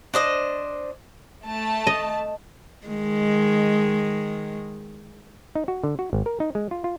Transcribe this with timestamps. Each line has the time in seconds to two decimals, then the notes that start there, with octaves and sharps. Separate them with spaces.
0.14 D4 C5 D#5
1.46 A3 A5
1.87 D#5
2.87 D#3 G#3
5.55 D#4
5.68 F#4
5.84 D3
5.99 F#4
6.13 G#1
6.26 A#4
6.40 D#4
6.55 G#3
6.71 F4
6.84 F4